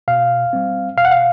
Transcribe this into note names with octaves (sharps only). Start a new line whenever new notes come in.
B2 F5
G3 C4
B2 F5
F#5
F5